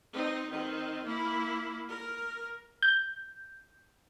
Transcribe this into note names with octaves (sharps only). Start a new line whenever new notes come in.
C4 D#4
D#3 C4
A#3 E4
A#4
G6